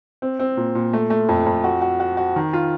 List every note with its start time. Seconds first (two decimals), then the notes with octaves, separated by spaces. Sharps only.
0.22 C4
0.39 C4
0.57 A#2
0.75 A#2
0.93 A3
1.10 A3
1.29 F2
1.46 F2
1.64 F#4
1.82 F#4
2.00 F#4
2.17 F#4
2.36 D#3
2.53 F4